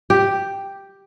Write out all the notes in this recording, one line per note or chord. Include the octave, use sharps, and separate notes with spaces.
G4